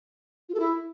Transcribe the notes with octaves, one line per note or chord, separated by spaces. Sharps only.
F4
A4
E4